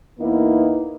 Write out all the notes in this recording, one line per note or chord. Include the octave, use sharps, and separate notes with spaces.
E2 A#3 B3 D#4 E4